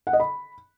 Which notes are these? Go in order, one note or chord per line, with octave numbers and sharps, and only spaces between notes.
F#5
D#5
B5